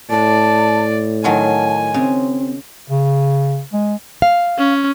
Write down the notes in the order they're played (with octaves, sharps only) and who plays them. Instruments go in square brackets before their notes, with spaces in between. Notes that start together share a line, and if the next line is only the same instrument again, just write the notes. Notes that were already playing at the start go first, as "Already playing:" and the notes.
[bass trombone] A2 [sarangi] D5 [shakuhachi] A5
[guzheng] D#3 F#3 F4 [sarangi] G#5 [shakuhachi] A5
[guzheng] C#3 [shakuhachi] C4
[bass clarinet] C#3
G#3
[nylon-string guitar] F5
[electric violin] C#4